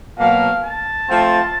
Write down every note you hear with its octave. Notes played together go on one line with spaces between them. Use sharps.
B2 F#3 A#3 F5
A5
F3 A3 C4 F4